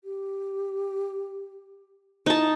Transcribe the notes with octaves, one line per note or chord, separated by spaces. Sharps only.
G4
D#4 E4 A5